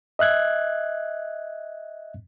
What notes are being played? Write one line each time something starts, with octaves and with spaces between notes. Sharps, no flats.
D#5 E5 F#6 G#6